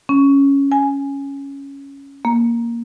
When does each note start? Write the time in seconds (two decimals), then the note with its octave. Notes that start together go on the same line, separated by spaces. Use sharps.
0.09 C#4
0.72 G#5
2.25 A#3